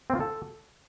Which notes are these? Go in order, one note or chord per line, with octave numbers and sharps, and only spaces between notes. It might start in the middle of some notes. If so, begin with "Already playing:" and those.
C4
F4
A4